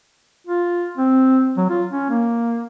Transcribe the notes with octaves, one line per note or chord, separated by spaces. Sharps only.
F4
C4
F#3
F4
C#4
A#3